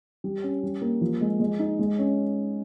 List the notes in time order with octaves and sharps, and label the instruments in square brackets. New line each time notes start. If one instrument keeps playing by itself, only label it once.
[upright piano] G3
C#4
G3
A#3
F3
G#3
G#3
D#4
G#3
C#4